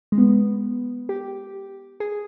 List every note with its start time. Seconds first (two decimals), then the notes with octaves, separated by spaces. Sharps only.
0.12 G#3
0.18 B3
1.09 G4
2.00 G#4